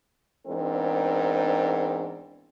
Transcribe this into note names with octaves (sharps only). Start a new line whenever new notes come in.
E2 G#2 C4 D4 A#4